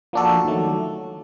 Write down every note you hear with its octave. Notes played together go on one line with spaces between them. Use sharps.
F3 A#3 D4 F#4 A4
D#3 F#3 A3